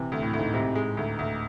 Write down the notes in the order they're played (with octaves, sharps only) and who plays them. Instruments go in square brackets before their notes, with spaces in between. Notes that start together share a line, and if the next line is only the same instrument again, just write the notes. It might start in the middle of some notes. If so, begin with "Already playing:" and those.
Already playing: [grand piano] C3 E3
[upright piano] D2
[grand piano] A2
[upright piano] D2
[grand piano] G#2
[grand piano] G#2 [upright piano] C3
[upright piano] G#3
D2
D2